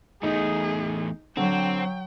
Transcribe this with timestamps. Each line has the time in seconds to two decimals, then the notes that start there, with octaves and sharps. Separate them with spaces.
0.23 E2 A3 D#4 G#4
1.37 D3 F#3 C4 G5